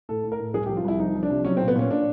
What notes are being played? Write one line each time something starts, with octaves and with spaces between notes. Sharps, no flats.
A2 A4
A2
A#4
A2
C2 G#4
G4
F3
F4
C2 E4
F3 D#4
F3
D4
C3
F#3 C#4
C4
A#2
B3
A#2 C#4
A#2 D4